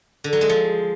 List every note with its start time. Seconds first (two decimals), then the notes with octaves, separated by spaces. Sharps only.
0.24 D3
0.33 F#3
0.41 G#3
0.49 F3